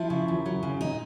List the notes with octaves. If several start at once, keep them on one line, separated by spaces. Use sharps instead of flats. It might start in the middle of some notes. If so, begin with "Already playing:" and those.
Already playing: F3 E4
C#3
D#2
F#3
C#3
A#2 D#4